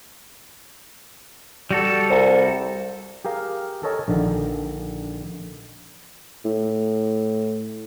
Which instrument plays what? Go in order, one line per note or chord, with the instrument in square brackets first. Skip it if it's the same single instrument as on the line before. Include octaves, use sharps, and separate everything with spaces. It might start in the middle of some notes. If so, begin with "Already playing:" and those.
[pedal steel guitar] G3 F#4 A4
[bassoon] C2
[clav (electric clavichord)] G4 G#4 A#4 F5
A4 A#4 C#5 D#5 G#5 A5
A#1 D3 D#3
[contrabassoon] A2